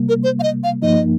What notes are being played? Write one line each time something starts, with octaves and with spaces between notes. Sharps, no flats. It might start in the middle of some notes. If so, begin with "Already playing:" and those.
Already playing: C3 G3 A#3
A#4
C5
F5
D#5
F5
G2 F3 A#3 D#4 D#5